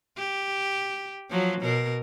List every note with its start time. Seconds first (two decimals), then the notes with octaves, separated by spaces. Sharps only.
0.17 G4
1.30 F3 F#3
1.62 B2 A#4